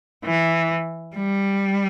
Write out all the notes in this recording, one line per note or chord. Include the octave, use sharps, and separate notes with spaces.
E3
G3